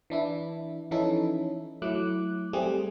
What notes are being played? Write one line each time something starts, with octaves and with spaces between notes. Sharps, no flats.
E3 D4 E4
E3 F3 C#4 D#4 E4 A4
F#3 A3 E4 D6 F#6
G3 A3 C4 G4 G#4